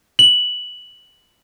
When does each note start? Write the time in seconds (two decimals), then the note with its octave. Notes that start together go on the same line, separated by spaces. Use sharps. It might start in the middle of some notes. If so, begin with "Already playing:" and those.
0.19 F#7